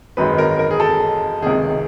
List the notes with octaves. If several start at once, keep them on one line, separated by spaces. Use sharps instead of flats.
G#1 F#2 D#3 G#3 B4
A#4
A#4
G#4
A4
C#2 C3 D#3 G#4